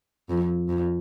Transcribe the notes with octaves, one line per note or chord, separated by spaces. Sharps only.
F2
F2